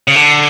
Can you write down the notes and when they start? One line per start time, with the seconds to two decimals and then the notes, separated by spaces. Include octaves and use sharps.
0.08 C#3
0.16 D3